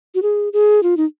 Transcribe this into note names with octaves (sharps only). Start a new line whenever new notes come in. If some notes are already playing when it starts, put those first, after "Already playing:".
F#4
G#4
G#4
F4
D#4